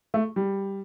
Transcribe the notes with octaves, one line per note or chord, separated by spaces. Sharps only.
A3
G3